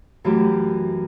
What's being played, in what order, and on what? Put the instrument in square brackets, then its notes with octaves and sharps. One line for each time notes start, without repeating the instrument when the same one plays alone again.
[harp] F#2 E3 A3 E4 G4